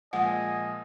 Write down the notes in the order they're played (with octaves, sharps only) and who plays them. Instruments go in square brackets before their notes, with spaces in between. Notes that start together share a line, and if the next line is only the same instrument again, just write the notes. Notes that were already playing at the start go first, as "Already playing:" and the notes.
[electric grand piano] A#2 F3 G#3 [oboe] D#5 [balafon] F#5 [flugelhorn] G#5